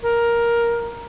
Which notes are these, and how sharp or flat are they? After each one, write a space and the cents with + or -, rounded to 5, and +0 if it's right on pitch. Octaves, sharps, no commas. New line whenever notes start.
A#4 +10